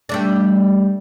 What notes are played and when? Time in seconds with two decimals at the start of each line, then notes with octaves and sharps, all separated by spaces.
0.09 G3 A3 D4